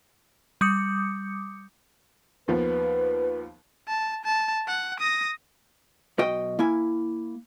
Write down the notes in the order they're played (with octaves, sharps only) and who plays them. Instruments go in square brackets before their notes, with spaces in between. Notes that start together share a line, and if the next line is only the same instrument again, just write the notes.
[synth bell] G3 D6 D#6 G6 C#7
[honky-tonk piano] D#2 F3 B3 [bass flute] B4
[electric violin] A5
A5
F#5
D#6 A#6
[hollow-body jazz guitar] B1 F#4 D#5 G5
A#3 E4 G#5